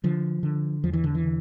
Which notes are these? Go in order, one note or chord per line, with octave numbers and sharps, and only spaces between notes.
D3 F3
D3
E2 F3
E3
D3
E3
D3